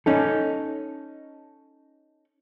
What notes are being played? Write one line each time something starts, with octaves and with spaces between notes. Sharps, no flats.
C#4 D#4 A4